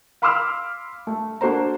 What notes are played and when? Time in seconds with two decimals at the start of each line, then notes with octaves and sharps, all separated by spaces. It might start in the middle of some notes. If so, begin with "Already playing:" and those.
0.22 F5 B5 C6 D6 E6 F6
1.07 A3
1.41 A#3 D4 F#4 A4 C5 A#5